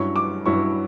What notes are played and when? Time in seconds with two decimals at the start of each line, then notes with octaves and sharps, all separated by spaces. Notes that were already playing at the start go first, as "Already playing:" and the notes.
Already playing: G2 F#3 C#4 E4 C#6
0.16 D6
0.46 G2 F#3 C#4 E4 C#6